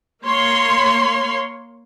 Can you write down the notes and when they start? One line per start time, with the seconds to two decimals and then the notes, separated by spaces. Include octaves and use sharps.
0.23 A#3 C#5 C6